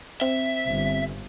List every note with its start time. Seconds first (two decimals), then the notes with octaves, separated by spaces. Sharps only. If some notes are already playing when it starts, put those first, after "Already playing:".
0.21 C4 E5
0.70 G1